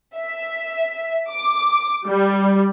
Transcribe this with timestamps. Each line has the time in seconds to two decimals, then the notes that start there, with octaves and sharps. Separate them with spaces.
0.16 E5
1.29 D6
2.07 G3